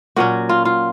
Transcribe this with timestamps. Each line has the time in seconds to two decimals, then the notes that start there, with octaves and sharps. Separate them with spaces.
0.16 A#2 F#3 C#4 F#4
0.49 F4
0.65 F4